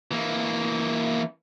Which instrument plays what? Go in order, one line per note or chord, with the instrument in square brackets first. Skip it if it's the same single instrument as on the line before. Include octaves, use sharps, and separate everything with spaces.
[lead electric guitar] E3 A#3